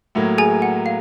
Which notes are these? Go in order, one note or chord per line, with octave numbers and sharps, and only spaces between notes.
A2 F#3 A#3
G#4 G#5
F#5
F5